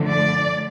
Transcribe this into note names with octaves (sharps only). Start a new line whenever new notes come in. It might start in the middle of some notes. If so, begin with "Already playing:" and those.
Already playing: D3 F3 A3
D5